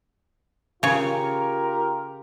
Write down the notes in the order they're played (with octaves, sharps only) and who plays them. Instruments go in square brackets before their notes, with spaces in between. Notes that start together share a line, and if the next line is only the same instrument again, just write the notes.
[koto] C#3 C#5 [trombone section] F4 G4 A#4